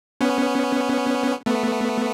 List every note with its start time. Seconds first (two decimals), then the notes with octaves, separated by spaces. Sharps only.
0.21 B3 C#4
1.46 A3 B3